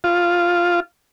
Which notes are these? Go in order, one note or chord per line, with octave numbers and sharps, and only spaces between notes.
F4